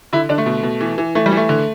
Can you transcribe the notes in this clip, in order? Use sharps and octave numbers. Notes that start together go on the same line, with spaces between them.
D3 E4
D3 D4
A3
B2
B2
E3
E3
E3 A3
G3
E3
A3
D3